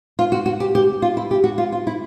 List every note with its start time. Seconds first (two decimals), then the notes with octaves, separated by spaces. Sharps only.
0.19 F4
0.32 F#4
0.46 F#4
0.60 G4
0.75 G4
1.02 F4
1.17 E4
1.31 G4
1.44 F#4
1.58 F4
1.72 F4
1.87 E4